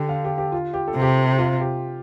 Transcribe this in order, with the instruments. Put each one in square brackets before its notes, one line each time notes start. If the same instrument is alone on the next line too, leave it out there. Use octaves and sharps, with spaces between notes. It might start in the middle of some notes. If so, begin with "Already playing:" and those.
Already playing: [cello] D3 [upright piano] G4 A4
[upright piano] F5
G4
G4
F4
G4
A4
[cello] C3
[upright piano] G4
F4
G4